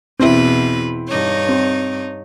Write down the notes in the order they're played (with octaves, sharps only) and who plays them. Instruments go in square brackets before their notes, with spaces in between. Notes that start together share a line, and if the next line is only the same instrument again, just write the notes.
[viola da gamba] E2 B2 B4 [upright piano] C4 E4
[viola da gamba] G2 D#4 C#5
[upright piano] C4